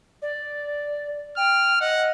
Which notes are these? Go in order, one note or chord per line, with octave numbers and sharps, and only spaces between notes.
D5
G5 F6
D#5 F#5